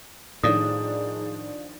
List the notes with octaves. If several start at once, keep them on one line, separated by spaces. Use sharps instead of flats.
A2 D#3 F3 D4 D#4 G#4 D#6